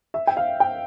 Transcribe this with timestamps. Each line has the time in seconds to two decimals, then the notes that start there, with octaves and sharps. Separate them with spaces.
0.14 E5
0.27 G5
0.37 F5
0.60 G5